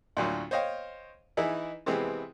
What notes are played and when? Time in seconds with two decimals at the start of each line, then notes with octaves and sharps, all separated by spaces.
0.17 D2 A2 F#3 F4
0.51 C5 C#5 D#5 F5 G5
1.37 E3 D#4 E4 G#4
1.86 C3 E3 G#3 B3 C4